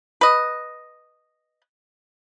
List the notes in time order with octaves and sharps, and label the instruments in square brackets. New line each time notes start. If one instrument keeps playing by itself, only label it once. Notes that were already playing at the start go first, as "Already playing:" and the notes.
[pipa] B4 D#5